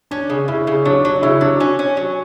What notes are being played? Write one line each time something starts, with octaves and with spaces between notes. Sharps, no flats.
C#4 D4
C#3
C#3 E4
C#3
F#3 D4
F#3 D4
C#3 E4
F#3 D4
C#4
C#4
F#3